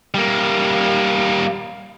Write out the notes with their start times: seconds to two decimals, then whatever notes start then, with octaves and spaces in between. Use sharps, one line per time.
0.14 G3 A#3